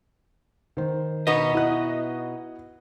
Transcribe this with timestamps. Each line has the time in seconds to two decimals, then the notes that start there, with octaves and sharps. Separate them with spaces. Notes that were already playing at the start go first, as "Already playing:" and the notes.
0.77 D#3 C5
1.27 B2 B3 D#4 D#5
1.53 E4 F#4 F#6